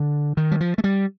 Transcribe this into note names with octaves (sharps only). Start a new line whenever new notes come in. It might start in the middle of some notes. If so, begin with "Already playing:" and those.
Already playing: D3
D#3
G3
F3
A3
G3